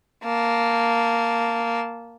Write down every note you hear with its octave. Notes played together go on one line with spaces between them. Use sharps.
A#3 A5